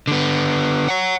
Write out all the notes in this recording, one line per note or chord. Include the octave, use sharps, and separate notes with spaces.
D3 B3
C#5 F#5